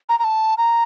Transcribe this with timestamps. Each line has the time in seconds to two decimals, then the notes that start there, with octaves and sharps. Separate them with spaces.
0.09 A#5
0.19 A#5
0.24 A5
0.58 A#5